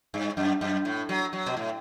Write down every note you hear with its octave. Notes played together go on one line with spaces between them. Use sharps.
G2
F#2
F#2
A2
F#3
F#3
B2
A2